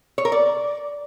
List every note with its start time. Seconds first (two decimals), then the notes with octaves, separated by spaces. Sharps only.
0.18 C#5
0.25 A#4
0.32 D5